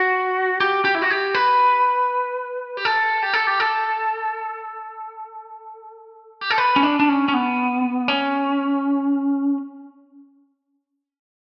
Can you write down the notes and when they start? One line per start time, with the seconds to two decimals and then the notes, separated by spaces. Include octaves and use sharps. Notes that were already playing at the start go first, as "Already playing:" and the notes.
Already playing: F#4
0.60 G4
0.85 G4
0.95 E4
1.02 F#4
1.10 G4
1.35 B4
2.77 G4
2.85 A4
3.22 G4
3.33 A4
3.47 G4
3.60 A4
6.41 G4
6.50 A4
6.58 B4
6.76 C#4
6.83 D4
7.00 D4
7.09 C#4
7.28 C#4
7.34 B3
8.08 C#4